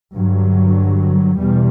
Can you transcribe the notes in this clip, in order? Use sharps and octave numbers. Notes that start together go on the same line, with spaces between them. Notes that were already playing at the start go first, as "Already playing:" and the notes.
G2 D3 F#3
E2 B2 G3